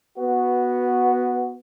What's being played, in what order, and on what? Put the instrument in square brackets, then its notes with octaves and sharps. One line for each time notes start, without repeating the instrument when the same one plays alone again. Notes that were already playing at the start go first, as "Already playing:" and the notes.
[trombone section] B3 F#4